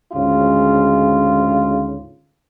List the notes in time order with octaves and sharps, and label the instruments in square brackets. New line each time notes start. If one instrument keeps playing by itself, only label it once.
[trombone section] D2 G#2 C#3 F4